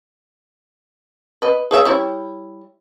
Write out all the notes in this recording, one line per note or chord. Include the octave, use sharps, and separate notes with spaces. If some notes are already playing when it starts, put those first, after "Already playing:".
B4 D#5
G#4 C#5 E5
G3 E4 C#5